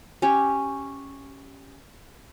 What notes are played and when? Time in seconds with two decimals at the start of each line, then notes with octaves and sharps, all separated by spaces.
0.22 C#4 G4 C#5